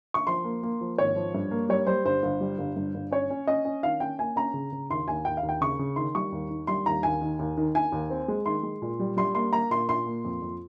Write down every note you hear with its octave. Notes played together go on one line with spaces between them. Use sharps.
C#6
F3 C6
A#3
A#3
F3
G#1 C#5
F3
G2
A#3
G3 C#5
G3 C5
G1 C5
G1
G3
G1
G2
G1
C#4 C#5
C#4
C#4 D#5
C#4
D#3 F5
C#4 G5
A#3 G#5
C#4 A#5
C#3
C#3
D#2 C6
D#2 G#5
D#2 G5
F5
D#2
G5
C#3 C#6
C#3
D#3 C6
G3 C#6
D#2
D#3
G3 C6
D#2 A#5
D#2 G#5
D#3
D#2
D#3
D#3 G#5
D#2
C4
G#3
D#3 C6
G#3
A#2
G3
G3 C6
A#3 C6
A#3 A#5
A#2 C6
A#2 C6
A#3
F2
F2